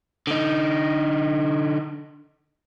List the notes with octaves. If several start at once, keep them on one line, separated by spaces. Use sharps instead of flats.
D3 D#4